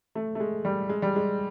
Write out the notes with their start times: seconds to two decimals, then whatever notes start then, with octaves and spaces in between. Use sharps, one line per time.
0.15 A3
0.35 A3
0.40 G#3
0.65 G3
0.89 G#3
1.02 G3
1.16 G#3